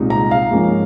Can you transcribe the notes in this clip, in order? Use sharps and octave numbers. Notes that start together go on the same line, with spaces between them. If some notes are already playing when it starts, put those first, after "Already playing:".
Already playing: C2 A#2 G#3 C4 D#4
A#5
F5
G#2 F3 A#3 C#4